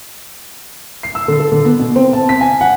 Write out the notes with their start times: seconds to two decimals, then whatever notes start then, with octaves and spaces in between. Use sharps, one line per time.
1.03 C7
1.15 E6
1.28 D3
1.40 A4
1.52 D3
1.65 B3
1.79 B2
1.96 C4
2.13 A5
2.29 B6
2.41 G#5
2.61 F#5